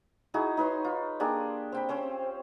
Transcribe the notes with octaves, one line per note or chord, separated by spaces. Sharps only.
D#4 E4 F#4 G#4
D#4 B4 C#5 C6
F4
A#3 D4 G4 G#4
C4 G5 B5
C4 C#4 C5